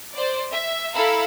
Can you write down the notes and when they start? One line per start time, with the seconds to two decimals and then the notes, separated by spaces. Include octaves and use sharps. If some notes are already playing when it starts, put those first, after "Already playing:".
0.14 C5 D5
0.52 E5
0.94 E4 A4 F5 A#5 B5 E6